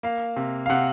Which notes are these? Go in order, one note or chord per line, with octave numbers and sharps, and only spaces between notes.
A#3 F5
C3
F5
C3 F#5